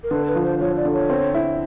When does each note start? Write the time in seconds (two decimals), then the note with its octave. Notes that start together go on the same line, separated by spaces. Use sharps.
0.03 A#4
0.11 D3 B4
0.27 B4
0.35 F3
0.44 C5
0.60 F3 C#5
0.76 D5
0.85 D3
0.93 C#5
1.10 C4
1.34 E4